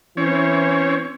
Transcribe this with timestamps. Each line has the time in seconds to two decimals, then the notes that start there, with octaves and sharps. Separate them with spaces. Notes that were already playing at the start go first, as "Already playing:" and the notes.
0.17 E3 C4 C#4 C#5